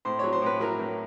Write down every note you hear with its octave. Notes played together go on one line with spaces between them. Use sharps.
A2 C5
F#3 C#5
C5
A2 B4
F#3 A#4
A2